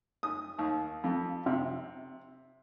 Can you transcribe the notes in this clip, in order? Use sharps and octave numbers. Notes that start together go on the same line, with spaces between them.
D#6
D#2
F2
C3